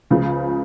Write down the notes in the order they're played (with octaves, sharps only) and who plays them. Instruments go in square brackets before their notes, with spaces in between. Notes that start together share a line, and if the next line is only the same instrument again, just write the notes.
[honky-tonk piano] C#2 C#3 F3